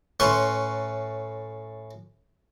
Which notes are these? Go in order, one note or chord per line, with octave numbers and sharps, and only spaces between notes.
A2 C#4 B4 C6 C#6